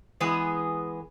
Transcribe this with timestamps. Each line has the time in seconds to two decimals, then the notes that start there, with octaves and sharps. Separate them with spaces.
0.20 E3 G#3 B3 G#4 B4